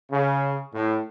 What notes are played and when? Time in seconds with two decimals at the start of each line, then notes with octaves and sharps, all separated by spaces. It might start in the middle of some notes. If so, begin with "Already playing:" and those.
0.10 C#3
0.73 A2